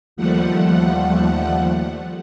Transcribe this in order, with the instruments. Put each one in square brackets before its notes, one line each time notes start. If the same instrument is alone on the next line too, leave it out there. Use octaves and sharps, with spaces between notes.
[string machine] D#2 F3 G3 A3 F#5